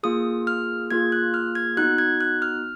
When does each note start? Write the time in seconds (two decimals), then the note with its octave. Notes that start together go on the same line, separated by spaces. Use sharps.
0.03 A#3 F4 G#4 D#6
0.47 F6
0.91 A#3 F4 G#4 G#6
1.12 F#6
1.34 F6
1.55 G#6
1.77 B3 D#4 F#4 F#6
1.98 G#6
2.21 F#6
2.42 F6